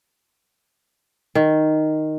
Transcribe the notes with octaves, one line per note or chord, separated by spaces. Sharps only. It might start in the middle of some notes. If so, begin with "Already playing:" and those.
D#3